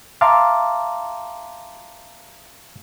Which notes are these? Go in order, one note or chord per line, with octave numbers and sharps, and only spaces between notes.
E5 F5 A5 A#5 C6 D6